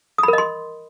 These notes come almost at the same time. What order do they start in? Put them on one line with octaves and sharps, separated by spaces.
D#6 B5 A#4 D#5 C6